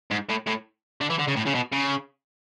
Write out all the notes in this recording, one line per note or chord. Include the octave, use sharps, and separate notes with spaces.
G#2
A2
A2
D3
E3
D3
C#3
A2
C#3
B2
C#3